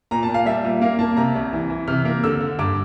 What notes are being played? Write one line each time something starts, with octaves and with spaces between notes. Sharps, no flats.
A#2 A#5
A5
A#2
F5
G3 E5
A#2
A#3 F5
A#3 A5
C3 A#5
C2
E3
E3
C3 F6
A#3
D3 E6
D3
G2 D6